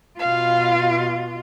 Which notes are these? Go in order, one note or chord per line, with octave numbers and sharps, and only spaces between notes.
B2 F4 F5